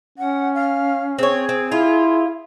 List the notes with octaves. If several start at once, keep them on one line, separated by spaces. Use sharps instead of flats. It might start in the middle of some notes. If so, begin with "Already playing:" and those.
C#4 F#5
F5
C4 G#4 C#5
C4
E4 F4